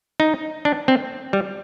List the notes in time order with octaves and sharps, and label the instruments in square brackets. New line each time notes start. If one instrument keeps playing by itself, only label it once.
[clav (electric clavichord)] D#4
D4
C4
G3